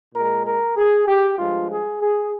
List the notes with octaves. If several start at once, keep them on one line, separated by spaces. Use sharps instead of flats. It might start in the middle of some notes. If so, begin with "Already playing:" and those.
A#2 G#3 A#4
A#4
G#4
G4
G2 F3 G#3 F4
G#4
G#4